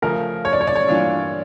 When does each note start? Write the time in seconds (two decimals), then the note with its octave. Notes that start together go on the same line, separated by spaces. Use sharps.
0.02 C#3 F3 A3 A#4
0.45 C#5
0.53 D5
0.61 C#5
0.67 D5
0.76 C#5
0.88 G2 E3 A#3 D4 F4